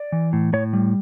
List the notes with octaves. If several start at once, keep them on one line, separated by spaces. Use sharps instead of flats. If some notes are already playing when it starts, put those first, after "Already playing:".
Already playing: D5
E3
A2
A2 C#5
G3